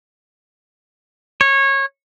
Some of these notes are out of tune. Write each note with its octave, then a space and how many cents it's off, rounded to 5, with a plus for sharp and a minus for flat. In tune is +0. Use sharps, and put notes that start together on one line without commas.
C#5 -20